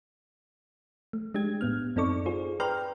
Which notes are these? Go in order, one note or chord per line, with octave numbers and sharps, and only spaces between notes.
A3
G#3 D4 G4 G#6
A2 B3 F6
F#2 C4 D#4 A4 D5 C#6
F4 G#4 C5
B4 D5 G5 A#5 C6 F6